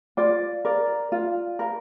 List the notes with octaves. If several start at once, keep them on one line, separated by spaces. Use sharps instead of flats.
F4 D5
A#4 D5
F4
A#4